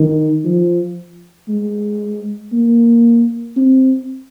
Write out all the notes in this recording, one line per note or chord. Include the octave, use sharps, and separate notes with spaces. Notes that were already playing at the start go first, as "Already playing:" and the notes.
Already playing: D#3
F3
G#3
A#3
C4